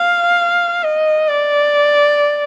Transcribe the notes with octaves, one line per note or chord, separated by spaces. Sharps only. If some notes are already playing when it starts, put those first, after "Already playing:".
Already playing: F5
D#5
D5